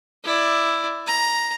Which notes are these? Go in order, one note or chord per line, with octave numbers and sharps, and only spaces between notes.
E4 D5
A#5